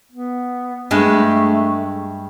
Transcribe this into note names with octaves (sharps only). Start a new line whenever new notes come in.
B3
G2 G#3 A3